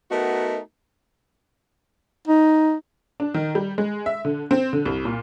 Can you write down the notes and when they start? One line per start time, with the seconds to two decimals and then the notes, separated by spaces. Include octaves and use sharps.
0.11 A3 B3 D#4 F#4 A#4
2.28 D#4
3.20 D4
3.34 D#3
3.55 G3
3.78 G#3
4.06 E5
4.25 D3
4.51 C4
4.73 D3
4.86 C2
5.05 A#2